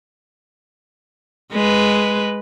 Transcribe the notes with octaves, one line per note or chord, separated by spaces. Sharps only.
G#3 B4